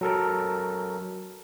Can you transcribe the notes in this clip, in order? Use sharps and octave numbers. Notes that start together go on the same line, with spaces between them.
F#3 A4 A#4